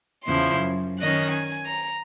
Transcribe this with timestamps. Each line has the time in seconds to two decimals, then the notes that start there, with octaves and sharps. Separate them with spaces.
0.25 E2 C#3 F3 E4 C6
0.55 F#2
0.99 D#3 C#4 D#5 F#6
1.31 G#5
1.67 A#5